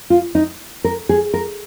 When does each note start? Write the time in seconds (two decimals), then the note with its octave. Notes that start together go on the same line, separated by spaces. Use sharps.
0.10 F4
0.35 D#4
0.84 A#4
1.09 G#4
1.34 A#4